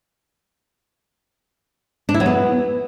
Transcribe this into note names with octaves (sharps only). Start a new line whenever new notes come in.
D4
E4
F#3
B3